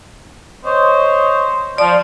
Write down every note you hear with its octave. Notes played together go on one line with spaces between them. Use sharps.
C5 C#5 D#5
F3 D5